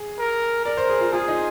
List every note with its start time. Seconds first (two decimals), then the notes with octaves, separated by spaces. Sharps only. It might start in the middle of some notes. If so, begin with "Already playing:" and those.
Already playing: G#4
0.18 A#4
0.65 A#4 D5
0.77 C5
0.90 G#4
1.01 F4
1.13 F4 G#4
1.28 D#4